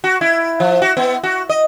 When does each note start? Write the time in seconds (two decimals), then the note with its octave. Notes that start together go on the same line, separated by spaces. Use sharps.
0.04 F#4
0.21 E4
0.60 F3
0.82 F#4
0.97 B3
1.24 F#4
1.49 D#5